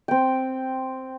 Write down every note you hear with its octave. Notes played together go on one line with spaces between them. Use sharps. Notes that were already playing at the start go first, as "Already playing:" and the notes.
C4 G5